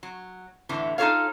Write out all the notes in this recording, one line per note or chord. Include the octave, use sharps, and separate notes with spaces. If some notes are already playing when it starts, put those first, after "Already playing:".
F#3
E2 A2 D3 E3
D#4 F4 G#4 A4 C#5 F5